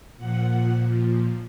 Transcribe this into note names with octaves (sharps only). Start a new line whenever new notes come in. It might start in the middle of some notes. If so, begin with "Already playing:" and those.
A#2 F3 F#5